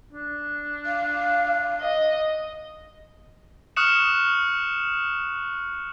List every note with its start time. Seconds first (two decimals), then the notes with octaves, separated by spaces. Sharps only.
0.13 D4
0.86 F5
1.81 D#5
3.76 C#6 D#6 F6 F#6 C#7 E7